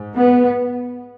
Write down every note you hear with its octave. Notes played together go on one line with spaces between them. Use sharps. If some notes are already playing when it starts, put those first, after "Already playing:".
Already playing: G#2
B3